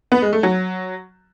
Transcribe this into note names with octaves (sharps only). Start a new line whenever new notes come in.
B3
G#3
A3
F#3